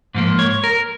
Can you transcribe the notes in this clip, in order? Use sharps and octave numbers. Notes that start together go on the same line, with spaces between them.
G#2 F3 A#3
C#5
A#4